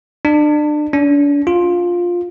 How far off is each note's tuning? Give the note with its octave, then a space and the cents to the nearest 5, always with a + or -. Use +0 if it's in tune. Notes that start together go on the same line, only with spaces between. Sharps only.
D4 +30
D4 -40
F4 +10